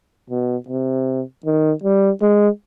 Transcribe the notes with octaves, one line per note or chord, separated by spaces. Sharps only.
B2
C3
D#3
G3
G#3